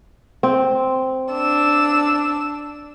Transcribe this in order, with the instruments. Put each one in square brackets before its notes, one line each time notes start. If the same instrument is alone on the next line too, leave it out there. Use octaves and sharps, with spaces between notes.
[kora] C4
[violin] D4 E6